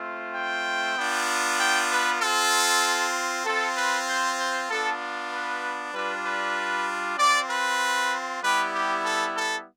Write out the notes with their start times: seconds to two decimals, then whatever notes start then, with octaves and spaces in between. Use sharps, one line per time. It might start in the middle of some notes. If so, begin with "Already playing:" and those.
Already playing: A3 C4 F4
0.35 G5
0.97 B3 D4 F4
1.59 G5
1.90 B4
2.21 C4 F4 A4
3.46 C4 F4 A4
3.76 B4
4.07 C5
4.39 C5
4.69 B3 D4 F4 A4
5.32 B4
5.94 G3 D4 F4 B4
6.25 B4
7.18 C4 F4 D5
7.50 B4
8.43 G3 B3 E4 G4 B4
8.74 G4
9.04 A4
9.36 A4